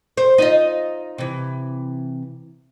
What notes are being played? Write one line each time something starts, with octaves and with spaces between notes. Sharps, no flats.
C5
D#4 F4 D#5
C3 E3